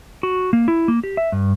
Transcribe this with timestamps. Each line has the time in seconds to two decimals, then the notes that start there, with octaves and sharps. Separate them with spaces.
0.23 F#4
0.53 A#3
0.68 E4
0.88 A#3
1.04 G4
1.17 E5
1.32 G2